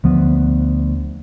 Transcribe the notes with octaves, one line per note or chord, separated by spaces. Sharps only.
D2 F3 B3